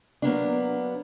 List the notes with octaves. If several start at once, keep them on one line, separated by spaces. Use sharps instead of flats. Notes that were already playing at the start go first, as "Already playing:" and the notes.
F#3 A#3 B3 D4